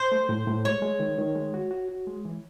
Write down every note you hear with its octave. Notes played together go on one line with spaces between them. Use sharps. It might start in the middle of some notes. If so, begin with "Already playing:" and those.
Already playing: C5
A3
A2
A2
G#3 C#5
G#3
D#3
D#3
G#3
F#4
F#4
F#4
G#3
E3